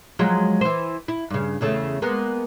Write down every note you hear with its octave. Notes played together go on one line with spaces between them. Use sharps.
F3 F#3 G#3
E3 C5
E4
G2 C#3
E2 C#3 A3
G#3 A#3 B3